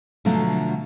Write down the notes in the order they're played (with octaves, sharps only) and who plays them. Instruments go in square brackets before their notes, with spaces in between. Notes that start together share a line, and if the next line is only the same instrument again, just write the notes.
[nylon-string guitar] B2 D3 F3 F#3 A3